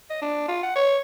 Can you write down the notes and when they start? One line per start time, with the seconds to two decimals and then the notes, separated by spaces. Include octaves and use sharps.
0.10 D#5
0.22 D4
0.48 F4
0.63 F#5
0.76 C#5